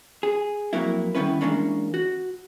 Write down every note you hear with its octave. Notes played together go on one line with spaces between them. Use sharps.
G#4
F2 F#3 A#3 E4
D#3 G3 B3 C#4 E4 B4
E3 G#3 A#3 C#4 D4
F#4